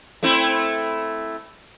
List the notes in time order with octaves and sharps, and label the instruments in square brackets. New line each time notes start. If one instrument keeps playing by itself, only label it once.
[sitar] A3 C4 E4